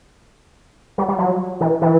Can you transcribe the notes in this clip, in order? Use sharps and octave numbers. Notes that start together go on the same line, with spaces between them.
G3
G3
F#3
E3
E3